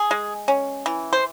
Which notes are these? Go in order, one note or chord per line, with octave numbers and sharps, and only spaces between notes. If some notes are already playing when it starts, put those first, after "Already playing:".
Already playing: G#4
G#3
C#4
E3
C5